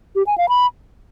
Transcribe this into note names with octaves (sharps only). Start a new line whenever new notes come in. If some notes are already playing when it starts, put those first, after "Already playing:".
G4
G#5
F5
B5